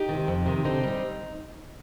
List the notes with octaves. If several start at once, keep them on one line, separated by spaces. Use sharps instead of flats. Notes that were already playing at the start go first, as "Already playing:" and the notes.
Already playing: D#4 G4
C3 D#3
F2
C3 D#3
D3 C4 D#4
G3 C4